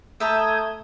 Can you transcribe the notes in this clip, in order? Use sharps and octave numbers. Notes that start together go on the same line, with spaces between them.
A3 E5 A5 A#5 D#6 G6 G#6